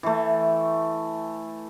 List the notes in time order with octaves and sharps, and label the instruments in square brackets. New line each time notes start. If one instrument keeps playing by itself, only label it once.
[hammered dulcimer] E3 A3